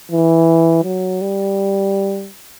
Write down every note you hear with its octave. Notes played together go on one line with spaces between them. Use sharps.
E3
F#3
G3